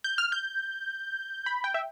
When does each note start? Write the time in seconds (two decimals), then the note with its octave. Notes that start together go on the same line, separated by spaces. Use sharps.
0.04 G6
0.18 F6
0.32 G6
1.46 B5
1.64 G5
1.74 E5